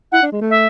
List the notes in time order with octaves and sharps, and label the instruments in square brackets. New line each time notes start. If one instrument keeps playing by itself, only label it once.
[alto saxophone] E4 [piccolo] F#5
[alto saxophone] D4
G#3
A3
[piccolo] E5